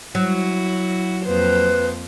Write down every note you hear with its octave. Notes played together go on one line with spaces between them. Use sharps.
F#3 E4 F#4
F2 A#3 B4 C5